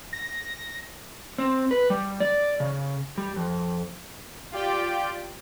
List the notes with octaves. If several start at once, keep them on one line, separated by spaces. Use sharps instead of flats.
A#6
C4
B4
G3
D5
C#3
G3
F2
F4 G4 D5 G5